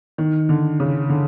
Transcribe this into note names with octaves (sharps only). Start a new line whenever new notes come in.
D#3
D3
C#3
D3